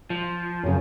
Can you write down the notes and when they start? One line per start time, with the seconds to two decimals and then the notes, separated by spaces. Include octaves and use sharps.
0.10 F3
0.63 F#2 A#2 C#3